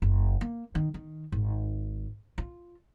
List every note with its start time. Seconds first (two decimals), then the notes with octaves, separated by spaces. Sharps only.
0.02 F#1
0.41 A#3
0.75 D#3
0.94 D#3
1.32 G#1
2.38 F4